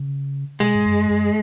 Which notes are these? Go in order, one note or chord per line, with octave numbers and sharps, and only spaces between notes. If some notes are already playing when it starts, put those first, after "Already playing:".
Already playing: C#3
B2 G#3
G#2
F#2
F#2